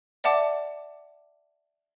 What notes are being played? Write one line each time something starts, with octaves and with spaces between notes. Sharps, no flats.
D5 E5 F#5 A5 D6